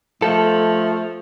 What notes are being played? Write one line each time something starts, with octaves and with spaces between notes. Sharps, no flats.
F3 A3 A4